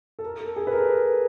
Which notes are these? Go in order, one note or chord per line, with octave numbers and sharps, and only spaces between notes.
A4
A#4
A4
G#4
B4
A#4